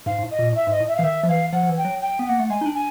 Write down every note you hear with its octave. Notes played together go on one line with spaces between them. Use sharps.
G#2 F5
G#2
A2
D#5
A#2
A2 E5
G#2 D#5
A2
E5
F5
E3
D#3 E5
F3
E3 F5
F3 F#5
F3
E3
G5
F#3
G5
B3
A#3 F#5
A3
G#3 G#5
D#4
D4
G#5